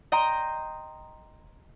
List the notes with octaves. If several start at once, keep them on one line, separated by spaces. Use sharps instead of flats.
D#5 G5 A#5 C6